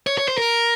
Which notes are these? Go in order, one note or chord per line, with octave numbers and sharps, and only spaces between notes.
C#5
C#5
C5
A#4